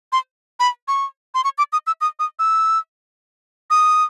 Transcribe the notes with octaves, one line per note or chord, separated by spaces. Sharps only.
C6
B5
C#6
C6
C#6
D6
D#6
E6
D#6
D#6
E6
D#6